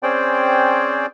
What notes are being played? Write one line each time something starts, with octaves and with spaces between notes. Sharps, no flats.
C4 C#4 G#4 C5 D5 G5